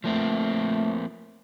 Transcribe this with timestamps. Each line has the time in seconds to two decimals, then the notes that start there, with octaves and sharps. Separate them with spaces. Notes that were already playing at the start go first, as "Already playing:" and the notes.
0.04 F3 A3 A#3 C4